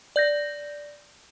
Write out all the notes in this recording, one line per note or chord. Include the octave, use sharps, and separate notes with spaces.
D5 G6 A#6